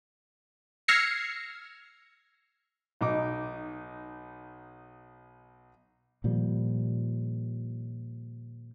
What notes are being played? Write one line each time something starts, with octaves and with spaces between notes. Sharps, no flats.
E6 F6 G#6 A#6 C7 C#7
B1 D#4 D6
A#2 D#3 F3 G3